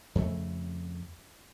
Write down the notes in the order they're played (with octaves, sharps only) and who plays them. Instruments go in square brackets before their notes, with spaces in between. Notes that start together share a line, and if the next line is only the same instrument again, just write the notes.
[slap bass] F2 C#3 A3